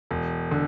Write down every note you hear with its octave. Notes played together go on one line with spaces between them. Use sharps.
E1
D3